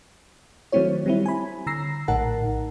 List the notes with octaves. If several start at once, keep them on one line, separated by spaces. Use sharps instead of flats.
D#3 F#3 A3 C4 E4 C#5
G3 C4 E4
G#5 B5
D3 A#5 E6 A#6 C7
A#1 A2 D#4 A#4 F#5 A5